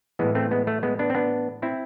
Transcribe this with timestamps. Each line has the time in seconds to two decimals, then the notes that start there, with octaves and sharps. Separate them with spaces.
0.19 A2 E3 G#3 B3
0.35 A3 C4
0.51 G#3 B3
0.67 A3
0.83 G#3 B3
0.99 B3 D4
1.10 C4
1.15 B3 D4
1.62 C4 E4